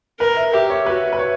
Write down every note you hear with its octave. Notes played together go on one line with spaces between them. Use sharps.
A#4 B4
E5
G4 E5
C#5
F#4 B4
B4
C#5